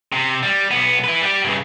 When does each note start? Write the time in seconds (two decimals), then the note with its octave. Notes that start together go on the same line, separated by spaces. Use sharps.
0.12 C3
0.43 G3
0.71 B1 B3
1.04 E4 B4
1.21 G3 G4
1.44 G2 C#3